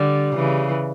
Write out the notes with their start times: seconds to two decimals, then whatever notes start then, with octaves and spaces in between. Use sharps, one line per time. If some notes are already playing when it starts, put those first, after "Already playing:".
Already playing: D3 G3
0.35 C#3 E3